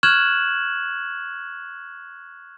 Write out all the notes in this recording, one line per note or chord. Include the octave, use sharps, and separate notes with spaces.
C#6 F6 F#6 G#6 E7 F#7